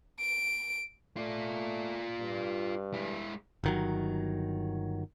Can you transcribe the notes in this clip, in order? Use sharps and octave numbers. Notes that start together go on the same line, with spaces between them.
D7
A3 F4 D5
G2
G#3 E4
G1 D#3 F#3